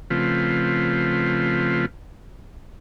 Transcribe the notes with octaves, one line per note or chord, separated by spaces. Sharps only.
C#3 F3 A3 C4 F4 B4